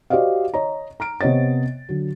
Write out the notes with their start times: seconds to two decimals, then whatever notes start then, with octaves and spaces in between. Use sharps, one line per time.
0.10 F#4 G4 C5 D5 D#5 F5
0.54 C#5 D#5 A#5
1.00 A#5 F6 D7
1.21 C3 B3 C#5 D#5 A6
1.89 D3 F#3